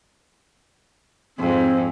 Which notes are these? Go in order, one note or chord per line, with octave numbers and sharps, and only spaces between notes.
F2 G#2 C4